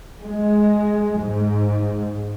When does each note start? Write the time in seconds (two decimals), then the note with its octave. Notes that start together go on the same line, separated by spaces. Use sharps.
0.23 G#3
1.18 G#2